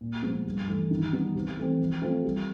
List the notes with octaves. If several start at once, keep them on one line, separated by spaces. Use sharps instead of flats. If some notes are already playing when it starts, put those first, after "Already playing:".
A#2
F3 G#3 B3
G2
E3 A3
D#3
G3 B3 D#4
C3
E3 A3 C4
F3
A3 C4 F4 A4
G3